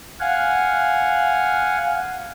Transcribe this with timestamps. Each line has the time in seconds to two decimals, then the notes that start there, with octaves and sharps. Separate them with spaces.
0.20 F5 F#5 G#5